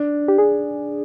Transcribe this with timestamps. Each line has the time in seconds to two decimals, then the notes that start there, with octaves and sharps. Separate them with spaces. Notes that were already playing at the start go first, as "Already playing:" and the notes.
Already playing: D4
0.28 G4
0.38 D4 G#4